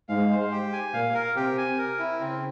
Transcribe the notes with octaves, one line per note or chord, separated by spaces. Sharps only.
G#2 G#3 F5
C5
G4
G#5
A#2 A#3 F5
A#4
C3 C4 G4
G#5
A#4
E4
C#3 C4 C#4